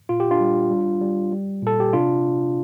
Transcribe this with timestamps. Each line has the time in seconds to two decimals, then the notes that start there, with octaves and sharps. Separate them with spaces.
0.09 A#2 F4
0.20 G4
0.31 D4 F4
0.40 G3
0.71 G3
1.01 G3
1.32 G3
1.63 A#2 A4
1.80 G4
1.93 C3 D4 F4